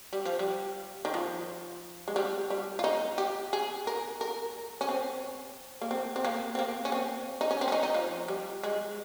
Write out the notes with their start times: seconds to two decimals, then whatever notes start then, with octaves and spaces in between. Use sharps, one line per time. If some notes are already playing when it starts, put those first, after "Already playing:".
0.13 G3
0.25 F3
0.39 G3
1.05 D#3
1.14 F3
2.08 G#3
2.16 G3
2.50 G3
2.79 F4
2.84 D#4
3.18 G4
3.53 G#4
3.87 A#4
4.21 A#4
4.81 C#4
4.89 C4
5.81 A#3
5.91 C4
6.16 C4
6.25 A#3
6.55 C4
6.59 A#3
6.85 C#4
6.92 C4
7.41 D#4
7.51 C#4
7.61 C4
7.68 C#4
7.72 D#4
7.83 D#4
7.94 F3
8.28 G3
8.63 G#3